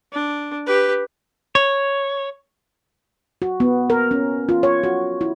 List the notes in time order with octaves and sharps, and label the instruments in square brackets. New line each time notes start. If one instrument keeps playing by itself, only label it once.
[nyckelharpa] D4
G4 B4
[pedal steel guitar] C#5
[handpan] F#4
B3
A#4
C#4
F4
C#5
F#4
E4